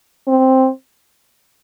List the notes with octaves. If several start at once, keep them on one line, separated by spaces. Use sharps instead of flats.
C4